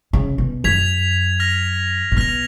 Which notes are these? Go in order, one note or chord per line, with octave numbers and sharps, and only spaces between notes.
C#3
B2
F#2 G#6 B6 F7
F6 A#6 F7
A#2
B2 F6 A#6 F7